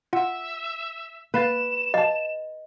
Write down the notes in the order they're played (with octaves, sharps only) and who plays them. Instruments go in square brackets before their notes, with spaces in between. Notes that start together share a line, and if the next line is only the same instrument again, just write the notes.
[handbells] F4 F#5 [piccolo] E5
[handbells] A#3 F5 A6 [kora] B4 [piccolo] E7
[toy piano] D#5 [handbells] F5 A5